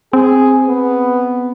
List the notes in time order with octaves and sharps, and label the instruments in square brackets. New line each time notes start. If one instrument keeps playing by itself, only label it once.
[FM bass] C4 [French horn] G#4
[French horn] B3